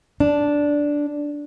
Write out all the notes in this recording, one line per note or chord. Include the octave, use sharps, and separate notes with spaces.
D4